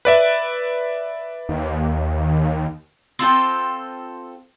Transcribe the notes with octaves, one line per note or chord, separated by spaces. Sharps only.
B4 D5 E5
D#2
C4 F4 A4 G5